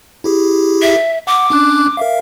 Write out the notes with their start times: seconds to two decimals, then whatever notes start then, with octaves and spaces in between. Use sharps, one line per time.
0.24 E4 G4 G#4
0.82 E5
1.27 F#5 D6
1.50 C#4 D4 F#6
1.97 A#4 E5 F5